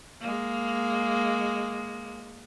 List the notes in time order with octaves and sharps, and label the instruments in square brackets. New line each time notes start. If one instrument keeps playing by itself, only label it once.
[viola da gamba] G#3 A#3